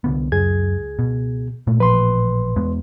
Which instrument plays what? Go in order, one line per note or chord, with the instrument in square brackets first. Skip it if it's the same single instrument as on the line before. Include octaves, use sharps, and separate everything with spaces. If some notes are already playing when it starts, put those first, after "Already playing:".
[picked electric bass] C2 D3 B3
[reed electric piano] C#2 G#4 G#6 [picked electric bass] F#2
[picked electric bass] B2
A#2 A3
[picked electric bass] A1 A#2 F3 [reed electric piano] B4 C6
[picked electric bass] E2 G#3 B3